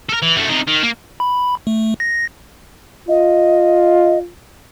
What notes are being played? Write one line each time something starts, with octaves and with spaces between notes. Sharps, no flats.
A4 A#4
E3
F#2 A3
C3 D#4
D#3
A#3
B5
A3
A#6
F4 D#5